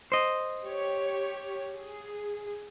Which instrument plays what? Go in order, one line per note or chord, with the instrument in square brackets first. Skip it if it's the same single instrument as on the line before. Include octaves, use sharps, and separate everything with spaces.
[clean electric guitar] C5 D#5
[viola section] G4 C#5
G#4